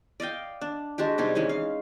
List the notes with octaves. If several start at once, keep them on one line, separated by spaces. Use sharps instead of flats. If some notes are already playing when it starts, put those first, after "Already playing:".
D5 D#5 F5 G5
D4
G#3 D4 F#4 G4
C3 G3 D#4 G#4
E3 G#3 C#4 D#4
F5